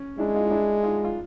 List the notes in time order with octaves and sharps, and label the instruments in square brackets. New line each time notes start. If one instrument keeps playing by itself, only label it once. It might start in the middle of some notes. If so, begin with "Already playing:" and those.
Already playing: [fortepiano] C#4
[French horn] G#3 [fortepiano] D4 E4
[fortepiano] D#4 F4
D#4
D4 E4
D#4 F4
F4